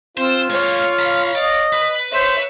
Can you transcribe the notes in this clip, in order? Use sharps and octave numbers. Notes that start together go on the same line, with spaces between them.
C4 F4 C5 E6
G#3 A#3 C#5 F5
A#5 B5
D5 D#5
B4 B5
C5 C#5 E5